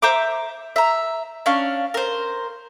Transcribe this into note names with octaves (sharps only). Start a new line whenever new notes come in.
C5 E5 A#5 D6
E5 A#5
C#4 D4 F5
A#4 C5